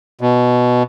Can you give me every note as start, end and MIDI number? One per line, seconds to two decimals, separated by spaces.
0.21 0.83 47